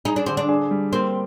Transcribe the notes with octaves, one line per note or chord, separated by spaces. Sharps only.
D#4 G#4
D4
D3 C4
D4
G#4
G3
A#3 C4